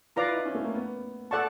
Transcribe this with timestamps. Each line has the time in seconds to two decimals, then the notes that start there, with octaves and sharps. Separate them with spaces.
0.16 F4 B4 D5 F5 A#5
0.25 E4
0.35 D#4
0.45 C#4
0.55 A3
0.64 A#3
0.74 B3
1.31 A4 D5 F#5 A5 C#6